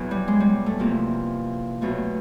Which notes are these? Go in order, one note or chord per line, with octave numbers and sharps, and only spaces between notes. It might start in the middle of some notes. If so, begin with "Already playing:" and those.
Already playing: E2 B2 F#3
G3
G#3
G3
A3
E2 C3 F3 A#3
E2 B2 F#3 A3